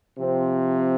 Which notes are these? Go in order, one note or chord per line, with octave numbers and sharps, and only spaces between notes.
C3 F3 C4